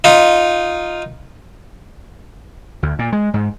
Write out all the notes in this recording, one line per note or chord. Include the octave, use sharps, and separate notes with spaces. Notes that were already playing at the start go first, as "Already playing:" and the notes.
D#4 F4
D2
A#2
G#3
G#2